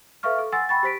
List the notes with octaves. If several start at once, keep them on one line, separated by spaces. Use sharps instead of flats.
A4 B4 E5 F5 C#6 F6
A4
F#5 G#5 C6 E6 A6
G5 B5 C#6 A6
G4 C5 B6 D7